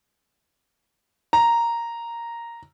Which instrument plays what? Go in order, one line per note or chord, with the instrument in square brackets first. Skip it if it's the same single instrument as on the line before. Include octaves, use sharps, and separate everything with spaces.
[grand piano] A#5